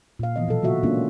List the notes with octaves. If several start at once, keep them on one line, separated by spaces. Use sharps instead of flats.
A#2 F5
E3 F3 B3 D#5
B2 F3 F#3 A4
C#3 A#3 B3 F4 F#4 E5
G#3 A#3 B3 C#4 D4 F4